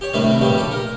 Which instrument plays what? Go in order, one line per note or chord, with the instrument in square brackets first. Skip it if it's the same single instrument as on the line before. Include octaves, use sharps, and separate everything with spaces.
[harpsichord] G4 C#5
A2 C3 D#3 G3 D4
C3 A3
A#1 G2 C#3 G3 G4
G4 A4
A#4